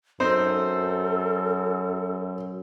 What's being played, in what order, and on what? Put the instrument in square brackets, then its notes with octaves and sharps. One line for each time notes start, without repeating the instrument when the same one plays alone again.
[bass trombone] F#2 [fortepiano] C4 D#4 C5 [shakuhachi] A4